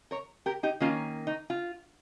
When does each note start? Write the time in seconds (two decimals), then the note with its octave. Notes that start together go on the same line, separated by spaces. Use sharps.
0.11 A#4 C#5
0.46 G4 A#4
0.63 D#4 G4
0.80 D#3 A#3 C#4 F4
1.27 D#4
1.50 F4